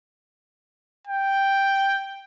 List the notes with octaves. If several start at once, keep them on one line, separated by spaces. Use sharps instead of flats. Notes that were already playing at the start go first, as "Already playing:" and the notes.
G5